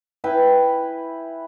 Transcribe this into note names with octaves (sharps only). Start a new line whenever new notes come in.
E4 B4 G5 G#5